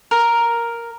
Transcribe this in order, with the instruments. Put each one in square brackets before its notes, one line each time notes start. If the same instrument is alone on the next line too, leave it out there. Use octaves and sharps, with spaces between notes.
[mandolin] A#4